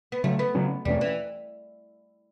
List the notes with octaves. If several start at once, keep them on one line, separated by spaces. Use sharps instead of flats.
B3
C#3 F#3 A3 C#4
B3
C#3 F#3 C#4
E2 B2 G3 A3 C#4
E3